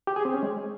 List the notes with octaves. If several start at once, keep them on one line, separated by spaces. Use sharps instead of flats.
G4
G#4
C4
C#4
G#3